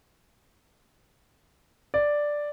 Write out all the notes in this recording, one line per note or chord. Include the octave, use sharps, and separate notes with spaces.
D5